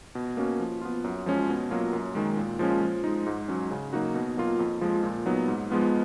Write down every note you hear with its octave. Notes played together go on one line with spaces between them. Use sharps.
B2
A#3 C#4 F#4
F3
B3 F4
F#2
F3 G#3 C#4
B2
F#3 A#3 F4
F#2
D#3 G#3
A#2
F3 G#3 C#4
F3
G#3 D#4
G#2
F#3 C#4
C#3
F#3 A#3 D#4 F#4
B2
F#3 A#3 F4
F2
F3 G#3
A#2
F#3 B3 D#4
G#2
F3 G#3 B3 F4